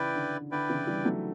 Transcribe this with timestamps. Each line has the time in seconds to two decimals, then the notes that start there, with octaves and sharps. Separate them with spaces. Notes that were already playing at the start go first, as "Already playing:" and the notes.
Already playing: C#3 E3 E4 B4 D5 G5
0.15 D3
0.51 D3 E4 B4 D5 G5
0.69 C#3 E3
0.87 E3 G3
1.05 F#3 A3